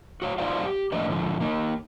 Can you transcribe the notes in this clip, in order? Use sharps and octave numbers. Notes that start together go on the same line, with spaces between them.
F#4 C#5 E5 F5
D#4 F4 F#4 C5 D5 F5
G4
F3 A3 A#3 D4 B4 D#5
G#2 D3 F3
A#3 D#4